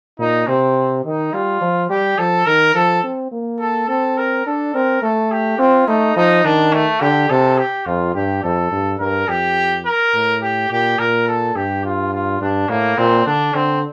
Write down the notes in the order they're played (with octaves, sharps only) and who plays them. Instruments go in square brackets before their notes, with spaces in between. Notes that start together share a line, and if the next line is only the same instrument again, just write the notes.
[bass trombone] A#2 [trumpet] D#4
[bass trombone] C3 [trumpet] C4
[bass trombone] D#3 [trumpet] D#4
[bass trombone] G3 [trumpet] F4
[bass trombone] F3
[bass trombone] G3 [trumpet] G4
[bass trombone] F3 [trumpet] A4
[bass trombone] D#3 [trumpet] A#4
[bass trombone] F3 [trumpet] A4
[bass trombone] C4
A#3
[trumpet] A4
[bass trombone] C4 [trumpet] A4
[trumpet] A#4
[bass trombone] D4 [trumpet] A4
[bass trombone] C4 [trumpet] A#4
[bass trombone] A3 [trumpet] A4
[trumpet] G4
[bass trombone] C4 [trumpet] F4
[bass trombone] A3 [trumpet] D#4
[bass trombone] F3 [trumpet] D#4
[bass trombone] D#3 [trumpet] D4
[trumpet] A3
[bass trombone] D3 [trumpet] G4
[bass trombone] C3 [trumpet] A4
[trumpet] G4
[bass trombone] F2 [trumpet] F4
[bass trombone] G2 [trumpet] G4
[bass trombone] F2 [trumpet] A4
[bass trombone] G2
[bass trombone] G2 [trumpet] A#4
[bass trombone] F2 [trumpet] G4
[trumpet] A#4
[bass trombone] A2
[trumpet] G4
[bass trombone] A#2 [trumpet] G4
[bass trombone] A#2 [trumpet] A#4
[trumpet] A4
[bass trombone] G2 [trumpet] G4
[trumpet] F4
F4
[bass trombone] G2 [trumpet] D4
[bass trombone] A2 [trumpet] A#3
[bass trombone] A#2 [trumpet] C4
[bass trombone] D3 [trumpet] D4
[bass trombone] D3 [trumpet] C4